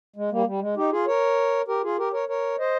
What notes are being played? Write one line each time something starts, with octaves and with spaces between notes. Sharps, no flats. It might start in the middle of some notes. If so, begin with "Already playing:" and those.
G#3
G3 A#3
G3
G#3
D#4 G4
F4 G#4
A#4 C#5
G4 A#4
F4 G#4
G4 A#4
A#4 C#5
A#4 C#5
C5 D#5